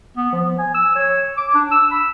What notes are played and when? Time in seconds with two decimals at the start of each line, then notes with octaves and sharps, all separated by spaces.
0.17 B3
0.32 F3
0.58 G#5
0.74 E6
0.95 C#5
1.37 D6
1.54 D4
1.71 E6
1.91 B5